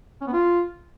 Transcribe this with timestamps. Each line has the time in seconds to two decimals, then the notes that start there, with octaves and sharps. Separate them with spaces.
0.22 C#4
0.27 B3
0.33 F4